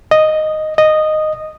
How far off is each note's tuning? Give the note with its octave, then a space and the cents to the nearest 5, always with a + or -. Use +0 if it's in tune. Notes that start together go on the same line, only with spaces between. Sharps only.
D#5 -5
D#5 -10